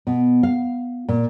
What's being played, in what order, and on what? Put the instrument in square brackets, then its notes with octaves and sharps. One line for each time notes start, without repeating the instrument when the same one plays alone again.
[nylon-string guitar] B2
F5
A#2